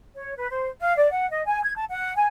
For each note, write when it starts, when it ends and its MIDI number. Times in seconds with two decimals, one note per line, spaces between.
0.15 0.34 73
0.36 0.47 71
0.50 0.68 72
0.80 0.95 77
0.97 1.08 74
1.10 1.28 78
1.30 1.44 75
1.46 1.62 80
1.63 1.72 92
1.75 1.84 81
1.89 2.13 78
2.16 2.27 80